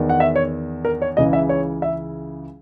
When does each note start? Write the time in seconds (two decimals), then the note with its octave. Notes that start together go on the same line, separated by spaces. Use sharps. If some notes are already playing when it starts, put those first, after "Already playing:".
Already playing: E2 D#3
0.09 F#5
0.20 E5
0.36 C#5
0.85 A#4
1.02 C#5
1.17 C#2 C#3 E3 D#5
1.33 E5
1.49 C#5
1.82 E5